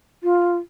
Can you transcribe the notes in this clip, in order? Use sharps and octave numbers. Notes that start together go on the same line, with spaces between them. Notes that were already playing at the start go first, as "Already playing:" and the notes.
F4